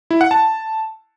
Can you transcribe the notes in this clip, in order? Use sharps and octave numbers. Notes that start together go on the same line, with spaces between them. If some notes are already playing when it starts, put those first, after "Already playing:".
E4
F#5
A5